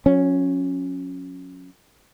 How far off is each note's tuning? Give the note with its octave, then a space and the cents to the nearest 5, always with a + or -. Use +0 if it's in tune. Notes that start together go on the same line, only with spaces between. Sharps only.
F#3 -45 C#4 -5